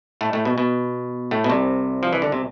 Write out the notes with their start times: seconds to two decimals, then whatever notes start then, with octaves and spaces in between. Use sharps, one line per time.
0.21 A2 A3
0.33 A2 A3
0.45 B2
0.58 B2
1.31 A2 A3
1.44 B2
1.50 C2 C3
2.03 F3
2.13 E3
2.22 D3
2.32 C3